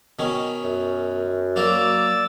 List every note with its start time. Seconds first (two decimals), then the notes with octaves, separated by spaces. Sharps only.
0.19 B2 D#3 C#4
0.64 F#2
1.56 F#3 A#3 A#4 D5 E6 A6